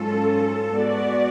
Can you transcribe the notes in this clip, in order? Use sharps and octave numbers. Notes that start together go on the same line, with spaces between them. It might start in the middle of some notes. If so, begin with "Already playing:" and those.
Already playing: G#2 F#3 C#4 F4 A4
G#3 B3 F#4 D5